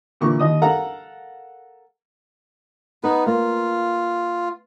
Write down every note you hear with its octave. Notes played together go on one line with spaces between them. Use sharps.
A#2 D3 E3 A#4 C#6
D#2 D#5 D#6
A4 A#4 F5 F#5 A#5
B3 D#4 B4
A#3 F4